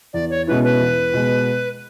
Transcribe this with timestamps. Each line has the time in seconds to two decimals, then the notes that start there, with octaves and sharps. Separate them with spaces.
0.13 E2 D5
0.30 C#5
0.47 B2 G#3 C#4 E4 B4
0.64 B4
0.80 E2
1.14 B2 G#3